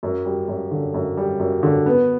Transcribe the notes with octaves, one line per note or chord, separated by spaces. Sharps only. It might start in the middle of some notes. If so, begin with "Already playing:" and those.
F#2
G3
F#2
D3
F#2
G3
F#2
D3
B3